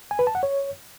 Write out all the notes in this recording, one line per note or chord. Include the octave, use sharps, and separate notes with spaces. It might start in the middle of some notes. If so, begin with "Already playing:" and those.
G#5
B4
A5
F#5
C#5